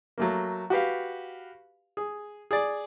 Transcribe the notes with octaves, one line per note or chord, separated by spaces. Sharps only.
F#3 A3 A#3
F#4 G4 B4 F5
G#4
G#4 D5